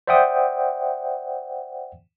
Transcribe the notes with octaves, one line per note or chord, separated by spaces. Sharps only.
C5 D5 E5 F#5 G5 D#6